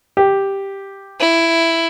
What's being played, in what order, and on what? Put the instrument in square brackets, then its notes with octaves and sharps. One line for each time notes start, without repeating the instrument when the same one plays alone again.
[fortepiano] G4
[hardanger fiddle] E4